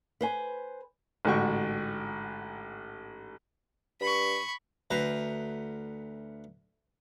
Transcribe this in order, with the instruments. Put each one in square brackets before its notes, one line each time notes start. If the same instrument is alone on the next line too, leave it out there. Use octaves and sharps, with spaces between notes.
[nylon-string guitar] B4 C5 G#5
[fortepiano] A1 G#2 D3 F#4 G5 C#6
[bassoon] G2 [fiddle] B5 C#6
[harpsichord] D2 B4 C5 A#5